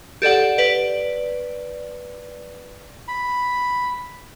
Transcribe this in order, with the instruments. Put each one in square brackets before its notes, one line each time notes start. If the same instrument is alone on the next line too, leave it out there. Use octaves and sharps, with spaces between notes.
[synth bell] G4 A4 D5 F#5
B4 D5
[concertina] B5